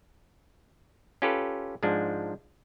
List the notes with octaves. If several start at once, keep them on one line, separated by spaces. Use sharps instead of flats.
C#4 F4 G4 A4 B4
G#2 F3 G#3 D4